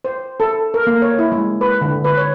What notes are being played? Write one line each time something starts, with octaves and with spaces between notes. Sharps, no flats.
C5
A4
A#4
A#3
C#5
E4
G#3
B4
D3
B4
C#5